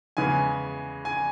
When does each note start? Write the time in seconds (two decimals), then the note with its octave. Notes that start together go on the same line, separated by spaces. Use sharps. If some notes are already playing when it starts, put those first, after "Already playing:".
0.17 E2 C#3 G#3 B3 G#5
1.05 G#5